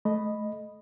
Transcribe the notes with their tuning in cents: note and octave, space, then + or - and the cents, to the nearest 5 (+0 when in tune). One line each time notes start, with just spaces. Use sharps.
A3 -25 D#5 -5 B5 +0